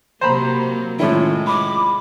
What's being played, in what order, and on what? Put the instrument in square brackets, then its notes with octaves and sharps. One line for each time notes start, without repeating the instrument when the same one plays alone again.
[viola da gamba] C3 F#3 A#3 [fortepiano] C5 A#5 B5
[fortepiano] A2 C#4 E4 [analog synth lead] D#3 [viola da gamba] G#3 [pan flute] F4
[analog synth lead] B5 [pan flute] D6